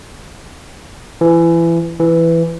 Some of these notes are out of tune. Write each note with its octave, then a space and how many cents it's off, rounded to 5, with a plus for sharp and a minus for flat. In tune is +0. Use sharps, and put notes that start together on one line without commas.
E3 +25
E3 +10